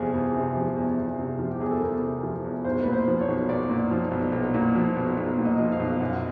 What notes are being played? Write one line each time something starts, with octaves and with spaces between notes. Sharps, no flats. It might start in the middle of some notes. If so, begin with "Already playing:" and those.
Already playing: E2 C3 F3 G#4
E2
C3
F3
E2
E2
C3
F3
G4
E2 G#4
A4
E2 A#4
C3
F3
E2
B1 C5
A#2 B4
C5
F3
C#5
B1
B1 D5
A#2
F3
B1
B1
A#2
F3
B1
B1
A#2
D#5
F3
F5
B1
F#2 F#5
F5